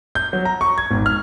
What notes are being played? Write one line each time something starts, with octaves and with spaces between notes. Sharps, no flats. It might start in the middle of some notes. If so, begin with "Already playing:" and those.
G6
F#3
A#5
C#6
G#6
G#1
F6